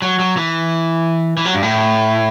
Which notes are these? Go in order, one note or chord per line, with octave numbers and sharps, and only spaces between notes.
F#3
F#3
E3
E3
F#3
G2
A2